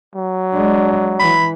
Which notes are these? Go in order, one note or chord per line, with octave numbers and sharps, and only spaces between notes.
F#3
G#3 D4
E3 B5